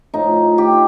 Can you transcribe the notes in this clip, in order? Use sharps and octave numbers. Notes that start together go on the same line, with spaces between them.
A2 F3 D#4
G4